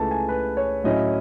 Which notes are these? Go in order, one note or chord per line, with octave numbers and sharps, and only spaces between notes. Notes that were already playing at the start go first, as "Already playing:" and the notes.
Already playing: C#2 C#3 E3 A3 A5
G#5
B4
C#5
A2 F#3 C#4 E4 D#5